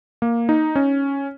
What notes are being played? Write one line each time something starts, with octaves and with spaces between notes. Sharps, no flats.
A#3
D#4
C#4